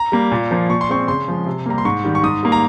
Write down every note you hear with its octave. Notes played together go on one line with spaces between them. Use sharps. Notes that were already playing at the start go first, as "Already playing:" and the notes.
Already playing: A#5
G3 A#3
A#2
F3 A#3
A#2 C#6
C6
G#3 C4 C#6
C#3 C6
F3 G#3
C3
G3 A#3 A#5
C6
G#2 C#6
D#3 G3
C#6
G#2 D#6
G3 A#3
A#5